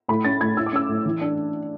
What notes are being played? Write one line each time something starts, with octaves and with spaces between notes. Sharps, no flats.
A2 B5
C#4 A6
A2 G#6
E4 E6
D6
C#4 E6
A2
E3
D4